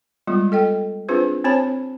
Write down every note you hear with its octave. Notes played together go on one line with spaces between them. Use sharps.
G3 G#3 B3 F4
A4 D#5 G5
C4 D4 F4 G#4 B4 C5
C4 C5 C#5 A5 B5